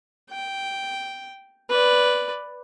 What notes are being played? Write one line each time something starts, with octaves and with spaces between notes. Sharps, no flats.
G5
B4 D5